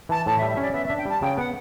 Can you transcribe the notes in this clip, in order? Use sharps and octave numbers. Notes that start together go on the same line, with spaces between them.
E3 A5
A2 A5
E5
G3
E5
C#4 D5
B3 E5
E5
D4
G5
G3 A5
C#3 G5
B3 F#5